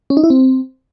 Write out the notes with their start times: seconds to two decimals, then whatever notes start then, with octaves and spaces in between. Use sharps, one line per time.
0.10 C#4
0.17 D#4
0.24 E4
0.30 C4